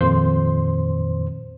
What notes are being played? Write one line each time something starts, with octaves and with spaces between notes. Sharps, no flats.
F2 A#2 D#3 C5 C6